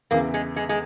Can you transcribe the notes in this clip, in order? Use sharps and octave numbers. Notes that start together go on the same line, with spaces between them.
E2 C#3 E3 A#3
G#3
G#3
G#3